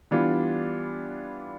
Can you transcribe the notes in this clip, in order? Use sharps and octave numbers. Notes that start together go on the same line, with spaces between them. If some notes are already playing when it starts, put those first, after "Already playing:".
E3 G3 B3 D4 F4